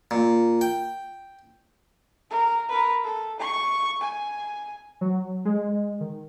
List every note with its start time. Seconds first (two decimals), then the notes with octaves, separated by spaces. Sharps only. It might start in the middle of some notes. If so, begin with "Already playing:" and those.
0.11 A#2
0.61 G5
2.31 A#4
2.69 A#4 B4
3.04 A4
3.40 C#6
4.01 G#5
5.01 F#3
5.45 G#3
6.00 D#3